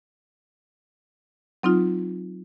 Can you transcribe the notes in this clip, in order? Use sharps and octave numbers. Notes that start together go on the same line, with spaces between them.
F#3 C4 D#4 F4